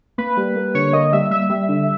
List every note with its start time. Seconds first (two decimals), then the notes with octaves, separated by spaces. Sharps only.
0.18 A#3 B4
0.37 G3
0.56 A#3
0.74 D3 C#5
0.93 A#3 D#5
1.13 G3 E5
1.31 G3 E5
1.49 G3
1.69 D3